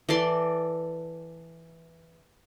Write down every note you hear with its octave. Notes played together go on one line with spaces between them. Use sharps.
E3 A4 D5 C6